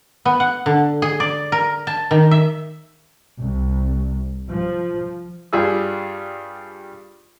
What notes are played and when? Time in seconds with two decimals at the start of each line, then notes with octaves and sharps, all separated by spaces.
0.25 B3
0.40 F#5
0.66 D3
1.02 G#4
1.20 D5
1.52 A#4
1.87 A5
2.11 D#3
2.31 E5
3.39 C2
4.50 F3
5.53 G2 G3 F4 G#4 E6